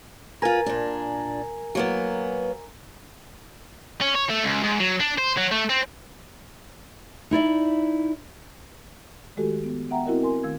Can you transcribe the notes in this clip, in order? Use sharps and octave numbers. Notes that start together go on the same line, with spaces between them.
F4 A#4 B4 G#5 A#5
A#2 D4
F#3 A#3 B3
C#4
C#5
A3
C#2
G#2
F#3
D4
C5
F#3
A3
C4
D#4 E4 D5 E5
D#3 G#3 A3 F#4 G4 A4
B3
B3 E5 F#5 G5 A#5
C4 E4 F#4 A#4 D#5
A#4 G#5 C6
D#3 A3 F5 E6 G#6